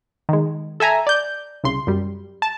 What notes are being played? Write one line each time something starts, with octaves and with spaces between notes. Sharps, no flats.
D#3 G#3
A4 E5 G#5 A#5
D5 G6
C2 C#3 C6
F#2 G3
A5